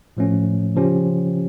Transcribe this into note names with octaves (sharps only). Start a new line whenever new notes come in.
A2 F3 A3 C#4
C#3 F3 C#4 G4